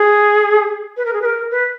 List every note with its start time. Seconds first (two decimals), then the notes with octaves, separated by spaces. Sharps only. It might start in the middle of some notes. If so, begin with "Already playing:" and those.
Already playing: G#4
0.97 B4
1.05 A#4
1.13 G#4
1.22 B4
1.25 A#4
1.51 B4